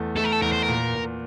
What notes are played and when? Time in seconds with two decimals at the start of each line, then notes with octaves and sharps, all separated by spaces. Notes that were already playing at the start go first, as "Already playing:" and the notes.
Already playing: E2 A3
0.16 A3 A4
0.24 A#4
0.33 A4
0.42 E2 A#4
0.52 C5
0.62 A#4
0.68 A#2
0.95 A#2